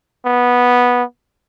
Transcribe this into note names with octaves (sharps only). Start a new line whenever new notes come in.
B3